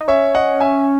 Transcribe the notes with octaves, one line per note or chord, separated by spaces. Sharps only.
D#4
C#4 C#5 E5
D#5 F#5
E5 G#5